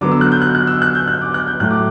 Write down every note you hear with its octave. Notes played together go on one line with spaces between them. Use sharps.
D3 F#3 B3 D6
E6
F#6
G6
F#6
F#6
E6
F#6
G6
F#6
D6
F#6
G6
A2 F#3 A3 F#6
D6